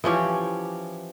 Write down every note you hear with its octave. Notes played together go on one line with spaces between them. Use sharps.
E3 F3 C#4 G4